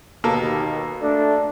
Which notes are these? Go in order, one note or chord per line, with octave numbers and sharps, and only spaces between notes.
D#2 B2 A#3 A4
A3 D4